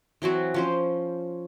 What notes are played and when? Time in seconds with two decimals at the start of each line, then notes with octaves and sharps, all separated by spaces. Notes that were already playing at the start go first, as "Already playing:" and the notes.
0.22 E3 F#3 C4 F#4
0.54 F3 C#4 C5